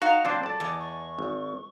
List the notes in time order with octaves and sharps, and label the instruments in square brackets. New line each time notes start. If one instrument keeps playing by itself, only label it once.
[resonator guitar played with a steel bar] D#4 F5 [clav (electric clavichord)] F#4 [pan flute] A#5
[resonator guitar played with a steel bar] A#2 F#3 [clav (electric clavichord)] C4 D4 C5 [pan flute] D6
[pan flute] A4 [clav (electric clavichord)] D5 A5
[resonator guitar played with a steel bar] E2 G#3 [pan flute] D6
[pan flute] C#6
[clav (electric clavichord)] G#1